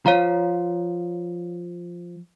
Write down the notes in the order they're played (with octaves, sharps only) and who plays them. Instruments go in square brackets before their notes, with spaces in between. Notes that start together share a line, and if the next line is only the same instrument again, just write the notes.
[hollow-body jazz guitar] F3 [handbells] C#5 F5 A#5